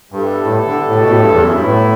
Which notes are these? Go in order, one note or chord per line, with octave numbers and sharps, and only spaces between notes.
G2 G3 B3 E4 A4 D5
A2
D3
A2
B2
A2
G2
E2
F#2 B2 F#3 B3 E4
G2
A2